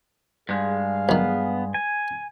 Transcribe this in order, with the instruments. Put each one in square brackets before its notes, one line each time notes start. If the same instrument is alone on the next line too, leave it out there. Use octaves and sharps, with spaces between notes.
[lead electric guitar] G2 G#3 [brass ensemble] G#4 F5
[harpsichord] B1 D#3 [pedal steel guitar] B3
[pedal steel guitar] G#5